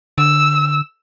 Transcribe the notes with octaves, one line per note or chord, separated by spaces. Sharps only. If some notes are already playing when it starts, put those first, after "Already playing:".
D3 E6